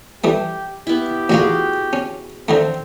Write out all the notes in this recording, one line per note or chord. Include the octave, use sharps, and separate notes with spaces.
E3 G3 A3 G4
B3 E4 G4
A1 D2 F4 F#4 G#4
C#4
D3 D#3 A3 C4